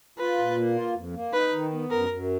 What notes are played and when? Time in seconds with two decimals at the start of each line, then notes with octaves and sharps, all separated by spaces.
0.19 F4 B4
0.38 A#2
0.56 A#3
0.76 F4
0.95 F2
1.14 A#3
1.33 D#4 B4
1.53 D#3
1.72 B3
1.91 F#2 A#4
2.10 F#2